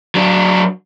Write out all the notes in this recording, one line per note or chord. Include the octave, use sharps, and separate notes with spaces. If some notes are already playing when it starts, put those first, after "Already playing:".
F#3 D4